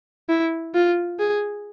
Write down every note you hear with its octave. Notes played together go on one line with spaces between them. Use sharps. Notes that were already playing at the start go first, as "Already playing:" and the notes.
E4
F4
G#4